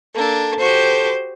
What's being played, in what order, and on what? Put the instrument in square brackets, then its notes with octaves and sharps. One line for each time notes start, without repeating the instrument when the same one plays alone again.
[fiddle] A#3 D4 [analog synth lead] A4
[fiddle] F#4 G4 [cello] C5